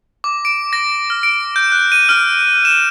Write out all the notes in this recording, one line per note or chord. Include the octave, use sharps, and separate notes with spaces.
D6
D7
A#6
F6
D7
G6
F#6
D#7
F6
E7